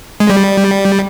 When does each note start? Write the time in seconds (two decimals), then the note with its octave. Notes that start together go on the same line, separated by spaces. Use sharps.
0.20 G#3
0.30 G3